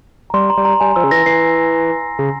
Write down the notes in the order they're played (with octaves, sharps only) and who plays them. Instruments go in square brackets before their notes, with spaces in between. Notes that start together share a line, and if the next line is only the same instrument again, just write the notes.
[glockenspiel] A#5
[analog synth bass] G3 [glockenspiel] C6
[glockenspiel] A#5
[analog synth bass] G3
[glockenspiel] A#5
[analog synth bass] G3 [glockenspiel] G#5
[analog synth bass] F3 [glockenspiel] E6
[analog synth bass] C#3
[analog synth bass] E3 [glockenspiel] A#6
[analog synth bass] E3 [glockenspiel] C7
[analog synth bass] C#3